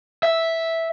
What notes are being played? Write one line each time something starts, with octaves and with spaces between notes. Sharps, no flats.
E5